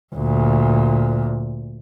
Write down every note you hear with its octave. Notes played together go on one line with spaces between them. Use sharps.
D2 A#2